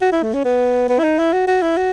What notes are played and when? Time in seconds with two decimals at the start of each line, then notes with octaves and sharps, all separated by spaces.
0.01 F#4
0.12 E4
0.23 A3
0.34 C#4
0.45 B3
0.89 B3
0.99 E4
1.04 D#4
1.19 E4
1.33 F#4
1.47 F#4
1.62 E4
1.77 F#4